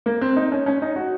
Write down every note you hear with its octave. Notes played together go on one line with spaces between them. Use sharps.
A#3
C4
D#4
C#4
C#4
D#4
F#4